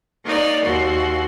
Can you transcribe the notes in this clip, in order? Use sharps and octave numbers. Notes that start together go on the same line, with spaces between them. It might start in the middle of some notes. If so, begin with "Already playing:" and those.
A#3 D#4 C#5 D5
D#2 F#4 C6